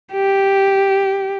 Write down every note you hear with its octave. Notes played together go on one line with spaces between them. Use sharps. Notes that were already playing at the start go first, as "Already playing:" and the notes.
G4